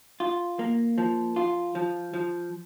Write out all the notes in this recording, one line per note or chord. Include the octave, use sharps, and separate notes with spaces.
F4
A#3
F3
F4
F3
F3